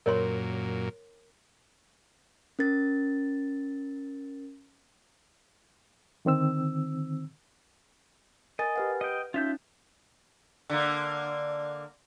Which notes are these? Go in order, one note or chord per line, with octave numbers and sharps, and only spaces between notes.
F#2 A#2 A#4 C#5 C6
C#4 A#4 A6
D3 D#3 C4 E6
A#4 D#5 G#5 A6
G4 B4 F#5
D#5 G5
C#4 D#4 F4 E5 G6
D3 A#3